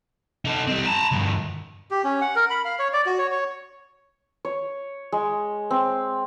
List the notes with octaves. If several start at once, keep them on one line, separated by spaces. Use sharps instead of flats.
D#4 A4
G3 C4
A5 A#5
D2 G2
G4
C#4
F#5
A#4
B5
F5
C#5
D5
F#4
C#5
C#5
C#5
G#3
C4